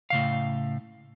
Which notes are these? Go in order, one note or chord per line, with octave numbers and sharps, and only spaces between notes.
A2 C#3 F5